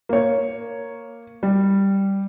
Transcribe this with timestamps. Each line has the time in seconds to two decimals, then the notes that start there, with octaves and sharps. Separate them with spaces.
0.09 A#3 C#5
1.43 G3